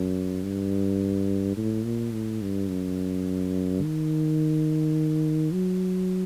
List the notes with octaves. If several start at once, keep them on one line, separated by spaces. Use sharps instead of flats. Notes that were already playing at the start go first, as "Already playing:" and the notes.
Already playing: F#2
G2
A2
A#2
A2
G2
F#2
D#3
F#3